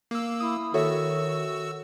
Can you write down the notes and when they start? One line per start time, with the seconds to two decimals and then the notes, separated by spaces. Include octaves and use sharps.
0.11 A#3 E6
0.40 E4 D#6
0.74 D#3 F#4 A4 C#5 E5 E6